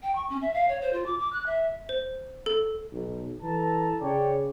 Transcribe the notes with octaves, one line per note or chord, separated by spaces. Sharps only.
G5
C#6
C#4
E5
F5
C#5
C5
F4
D6
D6
F#6
E5
C5
A4
B1
E3 A4 A5 A#5
C#3 C#5 D5 G5